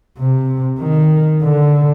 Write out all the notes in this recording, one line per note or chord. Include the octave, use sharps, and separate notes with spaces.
C3
D#3
D3